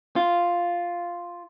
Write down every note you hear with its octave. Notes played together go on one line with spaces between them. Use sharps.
F4